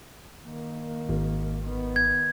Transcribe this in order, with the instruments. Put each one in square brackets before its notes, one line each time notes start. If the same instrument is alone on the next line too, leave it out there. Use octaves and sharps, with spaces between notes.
[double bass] D#3 A#3
[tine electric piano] G#1
[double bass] D#3 B3
[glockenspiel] G#6